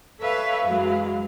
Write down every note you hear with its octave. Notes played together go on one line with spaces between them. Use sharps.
A4 B4 C#5 E5 F5
F#2 E3 F#3 G#3 F5